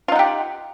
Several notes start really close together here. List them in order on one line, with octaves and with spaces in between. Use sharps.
F4 D#4 F#5 G4